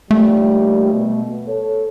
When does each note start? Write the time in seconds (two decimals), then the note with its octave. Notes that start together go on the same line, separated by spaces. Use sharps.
0.11 A#1 D#2 G3 A3
0.94 B2
1.48 A4 C#5